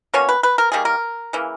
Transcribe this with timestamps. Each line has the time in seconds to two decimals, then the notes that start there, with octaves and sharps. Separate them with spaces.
0.14 B2 A#3 C#4 C#5
0.29 B4
0.43 B4
0.58 A#4
0.72 D#3 G3 A#3 G#4
0.85 A#4
1.33 C#3 E3 A#3